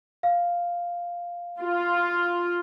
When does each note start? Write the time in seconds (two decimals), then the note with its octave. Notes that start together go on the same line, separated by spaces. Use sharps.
0.23 F5
1.61 F4